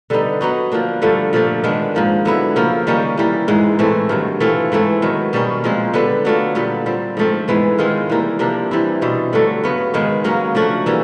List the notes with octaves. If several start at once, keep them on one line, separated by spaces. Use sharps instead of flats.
D3 G3 B3 D#4
F#3 B3 D#4 F#4
F3 A#3 D4
G2 D3 F3 A3
A#2 F3 A3 D4
D#3 G#3 B3 D4
G#2 F3 A#3
D3 F#3 B3 E4
C#3 F3 A#3
D#3 G3 A#3 C#4
E3 G3 A#3
G#2 E3 G#3
A2 E3 A3 C4
G2 D#3 F#3
E3 A3 C4 F4
G#2 E3 A3 C4
D#3 F#3 B3
B2 G3 A#3 C#4
A#2 F3 G#3 C4
D3 G3 B3
F#3 A3 D4 F4
A#2 G3 B3
A#2 G3 C4
G#2 F3 A3 C4
G#2 E3 G#3 B3
D#3 G#3 C4 F4
E3 G3 A#3
C3 F3 A#3 D4
E3 G3 C4 E4
B2 G3 C4
G2 D3 F#3 A3
C#3 F#3 B3
G#2 D#3 G#3 B3
C#3 F#3 A#3 C#4
F3 A3 D4 F#4
E3 G3 A#3 C#4